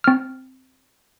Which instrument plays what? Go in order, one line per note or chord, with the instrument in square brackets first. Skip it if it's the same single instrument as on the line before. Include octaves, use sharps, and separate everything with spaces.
[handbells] C4 F6